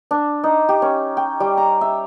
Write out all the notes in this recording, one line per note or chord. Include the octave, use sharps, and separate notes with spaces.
D4
D#4
G4
C#4
G5
G3
A#5
E5